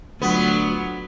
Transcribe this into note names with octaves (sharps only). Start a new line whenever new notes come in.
D2 F#3 B3 F4